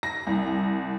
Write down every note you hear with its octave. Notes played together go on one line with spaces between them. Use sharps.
A#6
C2